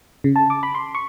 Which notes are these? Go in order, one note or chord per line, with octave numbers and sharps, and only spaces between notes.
C#3
A5
D6
B5
C6
C#6